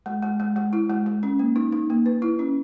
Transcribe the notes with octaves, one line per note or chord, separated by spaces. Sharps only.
G#3
G#3
G#3
G#3
E4
G#3
G#3
C#4
A#3
D#4
D#4
A#3
B4
E4
C#4